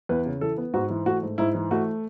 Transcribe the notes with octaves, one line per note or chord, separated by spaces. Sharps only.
E2 B4
C#3
E3 A4
B3
G#2 F#4
E3
A3 F#4
G#2
G#2 E4
E3
A3 F#4